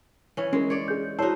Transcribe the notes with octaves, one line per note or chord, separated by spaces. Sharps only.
E3 C#4
G#3 C#4 A#4
C#5 D5
G#4 G6
D#4 E4 F#4 C5 C#5 A5